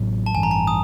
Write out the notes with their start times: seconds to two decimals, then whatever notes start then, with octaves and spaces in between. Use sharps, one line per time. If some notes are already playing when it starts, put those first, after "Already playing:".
Already playing: A1 A2 F#3
0.26 A5
0.34 A1 G2 E3 G#5
0.43 A#5
0.51 A5
0.68 D#6